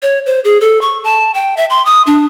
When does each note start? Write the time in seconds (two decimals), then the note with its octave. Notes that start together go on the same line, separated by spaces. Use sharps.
0.03 C#5
0.26 C5
0.44 G#4
0.61 A4
0.81 C#6
1.04 A5
1.34 G5
1.57 E5
1.70 C6
1.86 D#6
2.07 D4